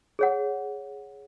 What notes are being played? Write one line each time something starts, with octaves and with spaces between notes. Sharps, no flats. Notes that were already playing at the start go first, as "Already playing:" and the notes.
G#4 C#5 F#5